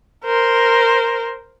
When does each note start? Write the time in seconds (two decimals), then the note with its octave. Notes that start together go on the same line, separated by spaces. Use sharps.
0.25 A#4 C5